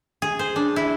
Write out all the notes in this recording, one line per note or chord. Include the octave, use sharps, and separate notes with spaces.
G#4
C5
D4
E4